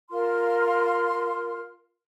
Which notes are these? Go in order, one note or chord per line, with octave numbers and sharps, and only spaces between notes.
F4 A#4 C6 F6